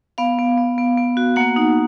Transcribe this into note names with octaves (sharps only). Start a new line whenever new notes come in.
B3 F5
B3
B3
B3
B3
F#4
A#3 F#5
D#4